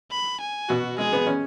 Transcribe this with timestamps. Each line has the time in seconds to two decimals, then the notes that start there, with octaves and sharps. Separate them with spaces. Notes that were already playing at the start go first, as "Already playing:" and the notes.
0.12 B5
0.41 G#5
0.69 B2 F#4
0.98 G#3 G#4
1.13 B3
1.27 C#4